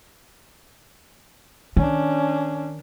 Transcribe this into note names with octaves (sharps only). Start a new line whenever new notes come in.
D#3 C#4 D4